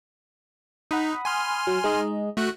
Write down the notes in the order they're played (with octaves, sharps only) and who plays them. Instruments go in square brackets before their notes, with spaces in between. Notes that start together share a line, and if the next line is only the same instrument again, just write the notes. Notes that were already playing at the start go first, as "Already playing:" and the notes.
[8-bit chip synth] D#4 [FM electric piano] F#5 B5 D#6
[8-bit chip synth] G#5 C6 F6
[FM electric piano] F#3
G#3 D#4 D#5
[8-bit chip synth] A3 F#4 F#6